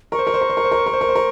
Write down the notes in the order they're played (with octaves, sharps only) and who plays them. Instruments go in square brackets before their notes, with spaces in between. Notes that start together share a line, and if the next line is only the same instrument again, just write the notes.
[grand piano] A#4 [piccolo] C#6
[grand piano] C5
A#4
C5
A#4
C5
A#4
C5
A#4
C5
A#4
C5
A#4
C5
A#4